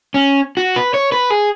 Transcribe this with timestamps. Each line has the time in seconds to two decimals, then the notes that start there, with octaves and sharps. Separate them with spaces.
0.14 C#4
0.57 F#4
0.76 B4
0.94 C#5
1.12 B4
1.30 G#4